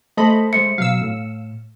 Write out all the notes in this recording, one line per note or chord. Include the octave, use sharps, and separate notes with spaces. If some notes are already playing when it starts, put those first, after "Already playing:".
A3 A4 C5 D#5 A5 B5
G#3 C5 E5 C#7
B2 F#3 F5 E6
A2